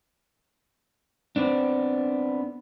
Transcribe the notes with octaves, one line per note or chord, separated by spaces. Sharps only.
B3 C4 D4